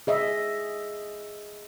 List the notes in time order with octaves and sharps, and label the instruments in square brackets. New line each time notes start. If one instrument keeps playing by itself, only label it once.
[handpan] G#4 D#5 E5